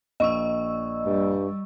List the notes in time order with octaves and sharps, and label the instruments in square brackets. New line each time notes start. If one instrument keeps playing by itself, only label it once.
[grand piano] A#1 [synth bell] D#5 C#6 E6
[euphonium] G2 [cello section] G3